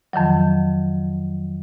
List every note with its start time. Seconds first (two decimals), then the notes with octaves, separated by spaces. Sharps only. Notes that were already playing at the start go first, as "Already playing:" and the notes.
0.13 F2 D#3 F3 F#3